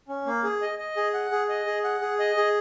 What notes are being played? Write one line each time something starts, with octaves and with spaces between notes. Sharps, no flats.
C#4
A#3
G#4
D#5
D#5
G#4
F#5
G#4
D#5
G#4
F#5
G#4
D#5
G#4